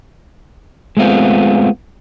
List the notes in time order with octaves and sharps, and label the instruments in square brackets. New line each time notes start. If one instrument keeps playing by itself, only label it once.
[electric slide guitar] G#3 A3 B3 C4 F4